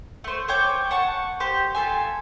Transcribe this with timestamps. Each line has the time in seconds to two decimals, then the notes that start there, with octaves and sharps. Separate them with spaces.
0.24 A3 C5
0.48 C5 C#5 G5 D6
0.91 F#5 A5 C#6
1.40 G4 C5
1.75 F4 A4 G#5